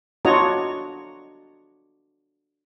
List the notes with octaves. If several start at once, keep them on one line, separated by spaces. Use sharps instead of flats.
D4 F4 F#4 C#5 D#5 A#5